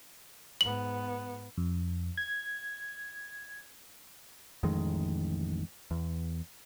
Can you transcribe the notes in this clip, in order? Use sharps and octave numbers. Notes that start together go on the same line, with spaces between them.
G#2 B3 F#7
F2
G#6
A1 F2 D#3 G#3
E2